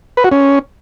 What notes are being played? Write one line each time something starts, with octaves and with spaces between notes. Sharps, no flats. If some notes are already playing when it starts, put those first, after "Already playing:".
B4
F#4
C#4